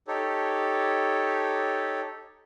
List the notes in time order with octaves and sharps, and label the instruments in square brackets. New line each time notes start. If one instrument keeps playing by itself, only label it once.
[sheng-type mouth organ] D#4 G4 A4 C#5